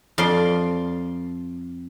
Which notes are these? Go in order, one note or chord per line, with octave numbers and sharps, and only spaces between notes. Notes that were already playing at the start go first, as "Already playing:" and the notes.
F2 F4 D5 C6